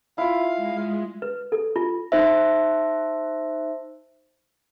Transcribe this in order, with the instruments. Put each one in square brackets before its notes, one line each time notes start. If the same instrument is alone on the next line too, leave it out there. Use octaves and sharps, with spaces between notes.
[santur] E4 F4 [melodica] F5
[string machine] G#3
[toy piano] B4
A4
F4
[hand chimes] D#4 C5 E5